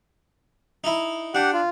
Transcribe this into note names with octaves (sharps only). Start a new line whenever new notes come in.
D#4 E4
D4 G4 F#5
F4